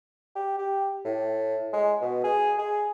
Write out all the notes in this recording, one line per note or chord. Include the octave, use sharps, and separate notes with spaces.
G4
G4
A2
G#3
B2
G#4
G#4